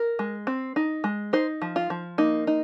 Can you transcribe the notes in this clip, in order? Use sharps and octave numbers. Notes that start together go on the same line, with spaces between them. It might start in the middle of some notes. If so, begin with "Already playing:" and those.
Already playing: A#4
G#3
C4
D#4
G#3
D#4 C5
F3
F4
F3
A#3 D#4
D#4